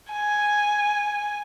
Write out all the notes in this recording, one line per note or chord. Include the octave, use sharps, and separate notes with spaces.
G#5